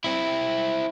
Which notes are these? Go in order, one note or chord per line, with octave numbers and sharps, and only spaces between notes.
C4 E4